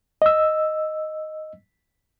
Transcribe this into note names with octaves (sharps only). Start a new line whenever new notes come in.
D#5 E6